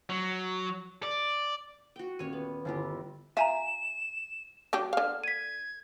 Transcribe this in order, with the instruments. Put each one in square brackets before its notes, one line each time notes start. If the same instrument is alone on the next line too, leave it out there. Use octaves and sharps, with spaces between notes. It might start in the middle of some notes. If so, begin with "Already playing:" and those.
[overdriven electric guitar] F#3
D5
[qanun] F#4 G5
[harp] D#1 [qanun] C#5 G#5
[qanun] B3
[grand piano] G1 [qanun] E4 F4 G4
[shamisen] F4 [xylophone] E5 G#5 A#5 [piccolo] E7
[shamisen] F#3 D4 G4
[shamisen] D3 F5 [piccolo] F6
[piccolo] G#6 [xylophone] B6 D#7